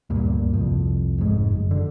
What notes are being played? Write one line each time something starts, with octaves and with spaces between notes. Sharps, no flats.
D2 G2 A#2
C2 F2
F1 G#2
F#1
D3